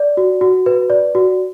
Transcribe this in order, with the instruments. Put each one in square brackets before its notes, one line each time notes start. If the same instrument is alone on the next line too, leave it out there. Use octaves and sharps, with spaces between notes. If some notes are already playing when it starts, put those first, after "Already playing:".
Already playing: [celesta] D5
F#4
F#4
B4
D5
F#4